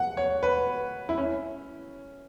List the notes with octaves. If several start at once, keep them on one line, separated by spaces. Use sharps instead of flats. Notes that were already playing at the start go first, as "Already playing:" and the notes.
Already playing: F#5
C#5
B4
E4
C#4